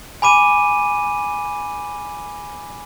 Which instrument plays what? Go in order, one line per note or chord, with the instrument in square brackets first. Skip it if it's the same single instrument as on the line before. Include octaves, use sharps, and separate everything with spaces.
[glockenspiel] G#5 B5 D6 D#7